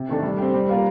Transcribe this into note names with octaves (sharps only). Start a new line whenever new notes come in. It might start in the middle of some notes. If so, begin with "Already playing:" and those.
Already playing: C3
D#3 A3 D4 A4
G3
C4 G4
G3
A#3 F4 A#4